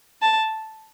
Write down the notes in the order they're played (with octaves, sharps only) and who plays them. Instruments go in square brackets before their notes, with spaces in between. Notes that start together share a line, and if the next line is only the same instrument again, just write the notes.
[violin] A5